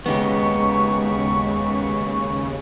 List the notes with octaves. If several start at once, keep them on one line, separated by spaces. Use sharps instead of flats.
D#2 C#3 G#3 B3 D#4 G4 B4 C#6